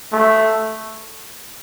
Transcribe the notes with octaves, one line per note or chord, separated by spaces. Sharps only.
A3